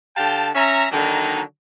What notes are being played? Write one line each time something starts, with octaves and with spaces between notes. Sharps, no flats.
D3 G4 F5 G5 A5
C#4 E5 A#5
D3 D#3 F#3 A#3 D4 D#4